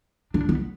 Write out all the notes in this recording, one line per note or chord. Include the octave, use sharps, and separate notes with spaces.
D4
B3